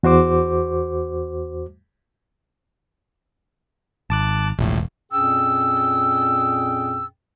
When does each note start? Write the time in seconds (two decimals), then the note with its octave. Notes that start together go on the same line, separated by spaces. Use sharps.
0.03 E2 F#4 C5 D6
4.10 G#1 A5 D6 F#6
4.59 E1 A#1 A2
5.12 F2 A#2 C#4 G#4 G5 E6